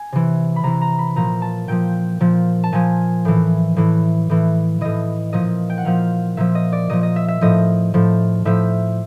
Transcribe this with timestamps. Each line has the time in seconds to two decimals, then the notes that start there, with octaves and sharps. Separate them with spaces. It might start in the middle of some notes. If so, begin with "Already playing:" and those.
Already playing: G#5
0.12 C3 E3
0.56 B5
0.63 C3 E3 A#5
0.81 A#5
0.99 B5
1.16 A#2 F3 A#5
1.42 A5
1.68 A#2 F3 G5
2.20 A#2 F3
2.64 A5
2.72 A#2 F3 G#5
3.25 A2 E3
3.76 A2 E3
4.29 A2 E3
4.81 A2 E3 D#5
5.33 A#2 F3 D#5
5.69 G5
5.78 F#5
5.85 A#2 F3 F5
6.37 A#2 F3 E5
6.55 D#5
6.72 D5
6.90 A#2 F3 D#5
7.03 D#5
7.16 E5
7.28 E5
7.41 A2 F3 D#5
7.94 A2 F3
8.45 A2 F3 E5